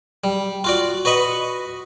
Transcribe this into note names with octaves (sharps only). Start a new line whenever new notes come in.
G3
F4 F#4 D5
F#4 B4 D#5 B5 C#6